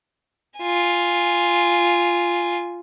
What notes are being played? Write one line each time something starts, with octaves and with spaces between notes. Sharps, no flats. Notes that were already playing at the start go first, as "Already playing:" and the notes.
F4 G#5